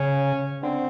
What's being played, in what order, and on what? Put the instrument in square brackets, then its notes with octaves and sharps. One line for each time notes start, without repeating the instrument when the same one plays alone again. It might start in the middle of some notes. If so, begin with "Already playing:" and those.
Already playing: [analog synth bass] C#3 [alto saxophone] C#4
[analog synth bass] D3 [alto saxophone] C4